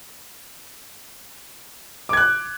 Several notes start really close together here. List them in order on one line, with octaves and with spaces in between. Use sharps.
D6 G#6 F#6